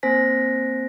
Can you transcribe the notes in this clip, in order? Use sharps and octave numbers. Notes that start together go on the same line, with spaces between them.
A#3 C4 C5 G#5 A#6 B6